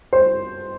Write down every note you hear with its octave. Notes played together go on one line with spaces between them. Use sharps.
C5